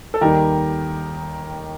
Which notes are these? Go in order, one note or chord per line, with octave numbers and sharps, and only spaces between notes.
A4
D#2 D#3 G3 G4 A#4